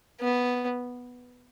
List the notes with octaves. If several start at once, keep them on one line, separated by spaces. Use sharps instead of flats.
B3